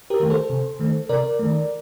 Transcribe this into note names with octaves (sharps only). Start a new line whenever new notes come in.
G4 A#4
D#3 A3
A4 C5
C3
D#3 A3
C3 A#4 D5
D#3 A3